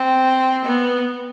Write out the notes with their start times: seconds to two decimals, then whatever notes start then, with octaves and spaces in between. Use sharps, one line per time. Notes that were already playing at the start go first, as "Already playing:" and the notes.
Already playing: C4
0.64 B3